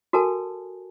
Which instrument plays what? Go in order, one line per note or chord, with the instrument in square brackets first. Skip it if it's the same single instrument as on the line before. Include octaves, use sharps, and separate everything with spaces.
[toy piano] F#4 A4 A#4 G#5 A5